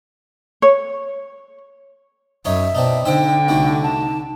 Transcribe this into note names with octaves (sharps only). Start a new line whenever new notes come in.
C#5
F#2 D#4 C#5 E5
B2 C4 D4 D#4
D3 C4 D#4 C5 E5 G5
C2 A3 D#4 F#4
A5